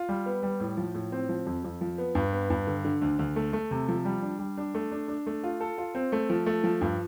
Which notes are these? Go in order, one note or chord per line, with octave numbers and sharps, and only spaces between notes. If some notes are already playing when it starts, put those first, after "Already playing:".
Already playing: F4
G3
B3
G3
A2
F3
A2
C4
F3
F2
F2
F3
B3
G2
B3
G2
D3
D3
D2
D2
A3
A3
C3
F3
G3
D4
G3
D4
A3
D4
D4
A3
F4
A4
F4
C4
A3
F3
A3
F3
G2